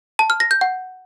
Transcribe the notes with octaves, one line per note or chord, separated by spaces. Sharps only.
A5
F6
A#6
G6
F#5